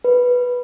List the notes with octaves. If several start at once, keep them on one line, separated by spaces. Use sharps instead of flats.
B4